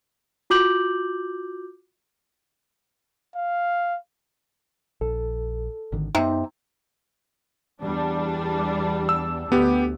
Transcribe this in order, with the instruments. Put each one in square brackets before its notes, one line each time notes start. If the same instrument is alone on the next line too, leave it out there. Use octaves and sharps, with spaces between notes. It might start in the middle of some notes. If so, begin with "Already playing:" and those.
[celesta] F4 F#4 D6 G6 F#7
[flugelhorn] F5
[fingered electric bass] A#1 [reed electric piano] A4
[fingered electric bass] G#1 D3 D#3
[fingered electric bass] F#2 B3 [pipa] C3 [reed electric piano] D#4
[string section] E2 G3 D4
[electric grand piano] E6
[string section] D2 [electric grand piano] B3 G4